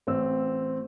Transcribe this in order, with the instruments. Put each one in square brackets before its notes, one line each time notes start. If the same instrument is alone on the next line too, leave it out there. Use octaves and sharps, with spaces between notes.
[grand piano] A1 C4 E6